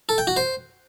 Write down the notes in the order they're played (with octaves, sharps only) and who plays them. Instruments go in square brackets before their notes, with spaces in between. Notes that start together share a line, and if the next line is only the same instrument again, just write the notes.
[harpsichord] A4
G5
F#4
C5